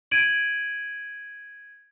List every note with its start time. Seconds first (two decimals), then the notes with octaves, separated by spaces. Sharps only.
0.11 G#6 D7 D#7 F#7